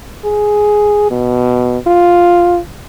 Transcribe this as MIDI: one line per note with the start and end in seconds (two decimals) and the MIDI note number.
0.25 1.07 68
1.11 1.78 47
1.88 2.59 65